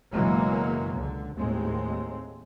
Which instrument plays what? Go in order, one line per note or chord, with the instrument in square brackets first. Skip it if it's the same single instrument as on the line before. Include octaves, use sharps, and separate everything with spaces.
[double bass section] F#1 B2 E3 F#3 G#3 A#3
C#2 D3
D#2 A2 G#3 C4